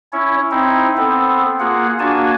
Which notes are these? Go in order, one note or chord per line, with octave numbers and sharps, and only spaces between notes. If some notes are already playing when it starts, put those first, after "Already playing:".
C#4 E4 C#5
C4 D#4 E4
B3 C4 A4
A#3 F4 G#4 F#5
A#3 D4 F#4 G#5 A5